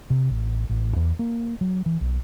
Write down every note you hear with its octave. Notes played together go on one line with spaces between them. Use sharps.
C3
A1
A1
E2
A#3
F#3
E3
B1